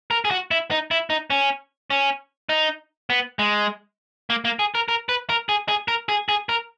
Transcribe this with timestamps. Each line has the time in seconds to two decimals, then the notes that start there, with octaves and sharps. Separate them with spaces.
0.11 A#4
0.25 G#4
0.31 F#4
0.51 E4
0.71 D#4
0.91 E4
1.10 D#4
1.30 C#4
1.90 C#4
2.49 D#4
3.10 B3
3.39 G#3
4.30 A#3
4.45 A#3
4.59 G#4
4.75 A#4
4.88 A#4
5.09 B4
5.29 A#4
5.49 G#4
5.68 G#4
5.88 A#4
6.09 G#4
6.29 G#4
6.49 A#4